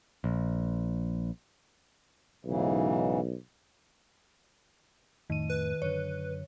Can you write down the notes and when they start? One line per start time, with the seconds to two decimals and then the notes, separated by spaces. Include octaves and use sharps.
0.24 A#1
2.45 B1 G#2 C#3 E3
5.30 F2 A2 D#3 A3 D#7
5.50 B4
5.82 F#2 D3 C#5